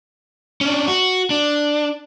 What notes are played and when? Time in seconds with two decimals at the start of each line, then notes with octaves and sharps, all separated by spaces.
0.61 C#4 D4
0.88 F#4
1.30 D4